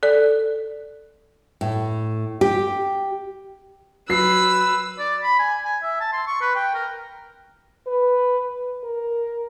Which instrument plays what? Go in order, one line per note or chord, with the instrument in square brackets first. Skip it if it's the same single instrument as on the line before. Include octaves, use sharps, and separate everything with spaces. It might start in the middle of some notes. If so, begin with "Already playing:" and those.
[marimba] A4 D5
[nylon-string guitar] A2
G4
[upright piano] F#3 C7 [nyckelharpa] B4 [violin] E6
[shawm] D5
B5
G#5
G#5
E5
A5
C6
C#6
B4
G5
A#4
[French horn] B4
A#4